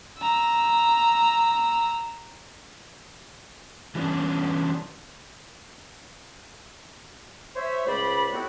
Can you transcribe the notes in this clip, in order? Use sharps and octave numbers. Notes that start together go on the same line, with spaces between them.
A#5 E6
E3 G3 B3 C#4 D4
C5 C#5 E5
C#2 A3 C5 D5 B5
A2 B3 C4 E4 F#4 G4